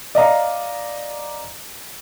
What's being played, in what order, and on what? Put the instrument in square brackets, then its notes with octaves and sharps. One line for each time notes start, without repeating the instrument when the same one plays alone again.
[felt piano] D5 D#5 F5 A#5